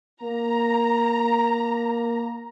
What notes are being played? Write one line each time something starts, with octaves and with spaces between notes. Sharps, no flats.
A#3 A#5